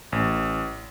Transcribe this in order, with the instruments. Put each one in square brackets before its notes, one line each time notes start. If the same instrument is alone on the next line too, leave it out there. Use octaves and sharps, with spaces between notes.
[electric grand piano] A1